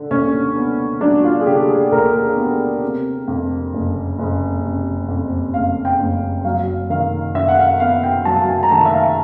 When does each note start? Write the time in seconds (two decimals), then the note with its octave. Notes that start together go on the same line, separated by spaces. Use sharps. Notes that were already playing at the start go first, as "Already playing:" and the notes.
Already playing: D3
0.11 D#2 C#4
0.56 B3
1.01 F#3 D4
1.24 F4
1.41 G#4
1.46 D3 G4
1.69 G#4
1.92 D#2 A#4
2.37 B3
2.83 C3
3.28 F2
3.74 F#1
4.19 F#1
4.64 C3
5.08 F2
5.54 F#1 F5
5.85 G5
5.99 F#1
6.45 F#3 F5
6.90 D#3 F5
7.35 F#2 E5
7.48 F#5
7.57 F5
7.80 B3 F5
8.03 G5
8.25 F#3 A5
8.49 G#5
8.63 A#5
8.71 D#3 A5
8.85 E5
8.94 F5